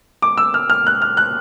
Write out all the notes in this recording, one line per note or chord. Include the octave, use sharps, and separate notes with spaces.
D6
E6
F6
F6
F#6
F6
F#6